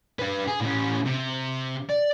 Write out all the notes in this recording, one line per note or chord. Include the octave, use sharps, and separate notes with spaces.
D4 B4
G#4
A2 C#4
C3
D5